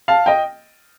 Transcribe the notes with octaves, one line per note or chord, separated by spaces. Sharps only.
F5 A5
D#5 G5